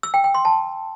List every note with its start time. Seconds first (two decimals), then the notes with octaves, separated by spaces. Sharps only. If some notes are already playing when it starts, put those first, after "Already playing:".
0.03 E6
0.14 G5
0.24 G5
0.34 C6
0.45 A5